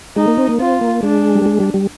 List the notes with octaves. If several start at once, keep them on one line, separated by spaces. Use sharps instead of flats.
G#3 D#4
A#3
C4
A#3
C4 F4
A#3
G#3 D4
G3
G#3
G3
G3